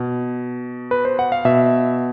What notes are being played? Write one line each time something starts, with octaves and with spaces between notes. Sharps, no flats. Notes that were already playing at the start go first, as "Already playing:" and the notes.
Already playing: B2
B4
C5
F#5
F5
B2 E5